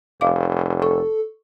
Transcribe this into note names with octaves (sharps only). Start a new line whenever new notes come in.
F1 D#5 F5 D6
A4 C#6